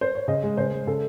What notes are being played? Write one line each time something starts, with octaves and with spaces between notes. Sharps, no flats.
C5
C#5
C#3 D#5
G#3
C#3 C5
G#3
C#3 A4